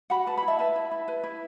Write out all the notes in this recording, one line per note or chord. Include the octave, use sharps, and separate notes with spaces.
F#4 F#5 B5
B4 A5
E4 B5
E5 A5
B4 E5 A5
E4
E4
B4
E4